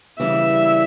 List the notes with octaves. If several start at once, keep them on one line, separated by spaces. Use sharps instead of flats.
C#3 E3 G3 E5